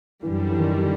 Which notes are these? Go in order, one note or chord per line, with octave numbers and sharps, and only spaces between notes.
F#2 D3 E3 G3
E3
D#3
E3